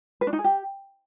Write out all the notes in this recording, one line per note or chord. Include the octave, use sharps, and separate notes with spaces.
B4
D4
D#4
G#4
G4